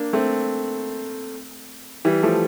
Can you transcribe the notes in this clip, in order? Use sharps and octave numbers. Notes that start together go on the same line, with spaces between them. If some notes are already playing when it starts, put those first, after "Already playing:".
Already playing: A#3 D4
A3 C4
E3 G3
F3 A3